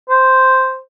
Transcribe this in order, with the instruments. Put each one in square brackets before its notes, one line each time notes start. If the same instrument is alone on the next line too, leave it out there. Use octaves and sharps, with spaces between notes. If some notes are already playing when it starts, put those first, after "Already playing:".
[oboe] C5